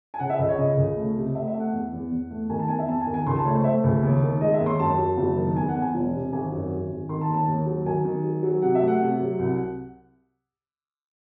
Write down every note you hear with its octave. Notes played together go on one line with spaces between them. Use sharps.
G#5
C#3 F#5
E5
C#2 D#5
C#5
C#3 D#5
C#2
A3
C3
A3 E5
E5
A3
F#5
E2
E2
E2
A3
D#3 G#5
A5
E2 G#5
E5
E2 A5
G#5
D#3
G#5
C#2 C6
A5
A3 C#5
C5
A3 E5
C#2
D#2
D#3
G#3 D#5
E5
D#2
C6
F#2 A5
F#3
F#1
D#3
E2 G#5
F#5
E2
G#5
E1
C3
G#1 G#5
F#2
G#1
G#1
D#3 C6
A5
D#2
A5
D#2
F#3
D#3 G#5
D#3
F#3
F#3
C3 F#5
E5
A3
F#5
C3
F#3
C2